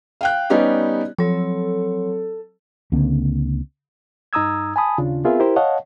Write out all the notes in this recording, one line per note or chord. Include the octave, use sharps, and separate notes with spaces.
F5 G5 F#6
G3 B3 C#4 D#4 G4 D5
F3 F#3 C4 A4 C#5
C#2 D3 A#3 C4
G2 D#4 A#5 D#6 E6 G#6
G#5 A5 B5 D#6
D#2 C#3 D4 F4
B3 C4 F4 G#4 A#4 E5
E4 G4 A#4 C5
C#5 D#5 F5 F#5 A5